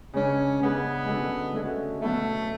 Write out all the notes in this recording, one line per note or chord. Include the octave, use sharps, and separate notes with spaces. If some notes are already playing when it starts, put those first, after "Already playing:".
C#3 G#3 C#4 D4 G#4 B4
C#3 G#3 B3 D4 G#4 B4
D3 G#3 C#4 F#4 A4
D3 G#3 A3 C#4 F#4 A4
B2 F#3 A3 B3 E4 A4